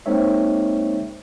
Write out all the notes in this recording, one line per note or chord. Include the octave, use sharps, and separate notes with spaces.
G#3 A#3 C4 D#4 C#5 E5